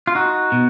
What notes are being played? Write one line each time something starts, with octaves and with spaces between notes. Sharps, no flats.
F4
D#4 F#4
B2